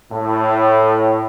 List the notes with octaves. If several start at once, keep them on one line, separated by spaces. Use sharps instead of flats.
A2